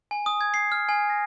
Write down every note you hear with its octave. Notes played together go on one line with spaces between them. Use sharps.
G#5
D#6
G#6
C7
F6
G#5
A#6